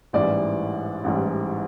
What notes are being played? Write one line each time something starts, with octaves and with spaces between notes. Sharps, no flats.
A1 G#2 E3 G3 D5
A1 G#2 E3 G3